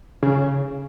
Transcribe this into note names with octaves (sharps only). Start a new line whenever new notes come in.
C#3